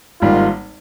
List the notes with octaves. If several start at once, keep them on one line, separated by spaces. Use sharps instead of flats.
G#1 G#2 G3 A#3 F4